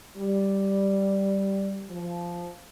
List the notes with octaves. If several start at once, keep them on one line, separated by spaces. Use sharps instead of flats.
G3
F3